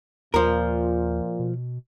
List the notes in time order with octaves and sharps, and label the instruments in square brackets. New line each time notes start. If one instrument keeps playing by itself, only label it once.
[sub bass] D#2 [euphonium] A#2 [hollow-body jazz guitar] F3 A#4
[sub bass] B2